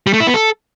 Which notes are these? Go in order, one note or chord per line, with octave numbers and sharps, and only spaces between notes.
G3
A3
E4
B3
A4